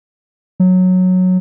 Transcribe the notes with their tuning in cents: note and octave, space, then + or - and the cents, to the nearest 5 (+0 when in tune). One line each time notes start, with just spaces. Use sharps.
F#3 -10